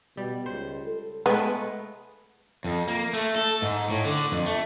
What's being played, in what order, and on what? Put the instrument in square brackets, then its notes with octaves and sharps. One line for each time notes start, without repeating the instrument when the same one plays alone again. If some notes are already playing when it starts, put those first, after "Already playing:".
[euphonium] B2 [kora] G3
[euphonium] C#2 [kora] C5
[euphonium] A4
[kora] G#3 A3 B4 [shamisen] B3
[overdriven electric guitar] F2
A#3
A3
A4
G#2
A2
D3
F2
A3